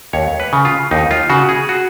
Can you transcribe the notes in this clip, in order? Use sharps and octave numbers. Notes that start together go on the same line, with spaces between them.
D#2 C#5
B4
C#3
F4
D#2 D#4
F4
C#3 F#4
G#4
F#4